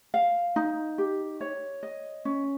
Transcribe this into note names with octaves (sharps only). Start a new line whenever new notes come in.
F5
D#4
G4
C#5
D#5
C#4